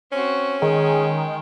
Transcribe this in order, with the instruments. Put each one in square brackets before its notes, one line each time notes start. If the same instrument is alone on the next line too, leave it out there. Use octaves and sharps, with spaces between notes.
[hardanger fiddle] C4 F#4 [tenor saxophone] C#4
[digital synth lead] D#3 [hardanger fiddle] G#3 G5 [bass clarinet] G#4